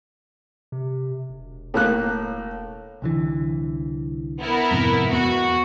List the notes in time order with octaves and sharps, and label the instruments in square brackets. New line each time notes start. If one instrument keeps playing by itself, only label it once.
[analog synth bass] C3
E1
[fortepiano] A2 A#3 F#6
[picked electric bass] C2 D3 E3
[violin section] B3 E4 A#4
[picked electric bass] F2 G#2 C3
[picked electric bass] E2 B3 [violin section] F#4